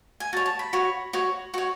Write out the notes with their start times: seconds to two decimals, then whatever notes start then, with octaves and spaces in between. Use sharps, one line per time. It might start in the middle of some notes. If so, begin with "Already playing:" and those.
0.20 G#5
0.33 F#4 C#5 A5
0.46 A5
0.59 B5
0.73 F#4 C#5
1.13 F#4 C#5
1.54 F#4 C#5 C#6